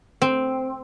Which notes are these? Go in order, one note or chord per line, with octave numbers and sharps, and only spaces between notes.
C4